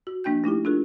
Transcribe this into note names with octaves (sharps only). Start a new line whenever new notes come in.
F#4
F3 A#3 D4 G5 G6
A3 D#4 E4 G4
D4 F4 G#4 A#4